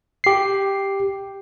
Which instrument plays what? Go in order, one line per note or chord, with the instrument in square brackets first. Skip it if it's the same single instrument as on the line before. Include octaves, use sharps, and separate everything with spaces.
[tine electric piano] G4 C7